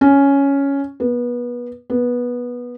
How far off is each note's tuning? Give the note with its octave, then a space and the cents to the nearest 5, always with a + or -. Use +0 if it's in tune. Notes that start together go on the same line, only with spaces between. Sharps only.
C#4 +5
B3 -25
B3 -15